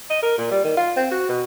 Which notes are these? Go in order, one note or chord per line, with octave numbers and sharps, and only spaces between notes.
D#5
A#4
A#2
G3
D#3
F4
C4
F#4
B2